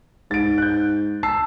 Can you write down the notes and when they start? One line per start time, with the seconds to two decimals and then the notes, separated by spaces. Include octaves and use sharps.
0.31 G#2 A6 D7
0.58 F#6 G6
1.23 A5 E6 C7